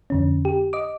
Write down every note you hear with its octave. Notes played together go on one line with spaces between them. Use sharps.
F2 D3 C#4
G4
D#5 D6